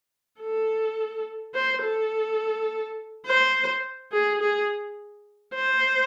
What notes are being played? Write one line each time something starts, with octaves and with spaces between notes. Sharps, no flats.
A4
C5
A4
C5
G#4
G#4
C5